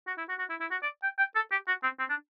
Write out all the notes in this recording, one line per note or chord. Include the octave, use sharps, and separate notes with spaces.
F#4
E4
F#4
F#4
E4
E4
F#4
D5
G5
G5
A4
G4
F#4
C4
C4
D4